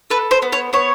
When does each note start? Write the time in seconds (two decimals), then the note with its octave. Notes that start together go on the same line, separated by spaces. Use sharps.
0.10 A4 B4
0.31 C5
0.42 B3
0.52 C#5
0.73 B3 C#5